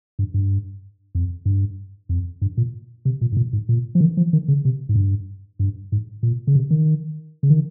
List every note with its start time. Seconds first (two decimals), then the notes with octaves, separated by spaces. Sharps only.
0.19 G2
0.34 G2
1.15 F2
1.46 G2
2.09 F2
2.42 G2
2.57 A#2
3.05 C3
3.21 A#2
3.32 G#2
3.37 A#2
3.53 G#2
3.69 A#2
3.95 F3
4.00 D#3
4.17 F3
4.33 D#3
4.48 C#3
4.65 C3
4.89 G#2
4.96 G2
5.59 G2
5.92 G#2
6.23 A#2
6.47 C#3
6.55 C3
6.71 D#3
7.43 C#3
7.50 D#3